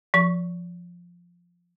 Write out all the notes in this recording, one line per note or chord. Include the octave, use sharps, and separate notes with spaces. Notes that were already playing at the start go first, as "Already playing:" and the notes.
F3 C#6